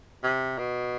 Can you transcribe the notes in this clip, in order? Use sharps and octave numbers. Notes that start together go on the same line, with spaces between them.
C3
B2